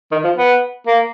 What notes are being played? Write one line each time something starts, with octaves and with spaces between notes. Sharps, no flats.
D#3
F3
B3
A#3